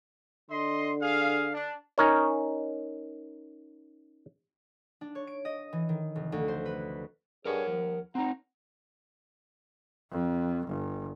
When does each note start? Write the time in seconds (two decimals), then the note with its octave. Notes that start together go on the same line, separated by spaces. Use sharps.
0.50 D3 D#5 C6
1.02 G#4 F5
1.54 D4
1.98 C#4 D#4 A#4 C#5
5.01 D4
5.15 C#5
5.27 D7
5.45 D#5
5.73 E3
5.89 D#3
6.15 F1
6.32 D2
6.48 C5
6.65 B4
7.45 G2 G#4 A#4 C#5 F#5
7.67 D#2 F3
8.15 C4 D#4 F#5 A#5
10.11 F2
10.67 G1